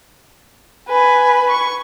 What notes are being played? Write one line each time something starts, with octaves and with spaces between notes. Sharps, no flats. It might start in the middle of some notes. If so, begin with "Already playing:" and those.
B4 G#5
C#6